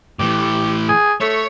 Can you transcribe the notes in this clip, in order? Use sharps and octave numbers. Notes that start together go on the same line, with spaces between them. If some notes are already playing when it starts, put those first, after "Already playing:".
A2 E3 G4
G#4
A3 C#5